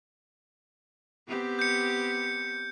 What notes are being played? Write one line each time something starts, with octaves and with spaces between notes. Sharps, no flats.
B3 C4 G4
G6 C#7